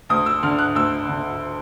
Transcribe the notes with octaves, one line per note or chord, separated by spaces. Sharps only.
D2 D#6
E6
D3 F6
F#6
D2 E6
D3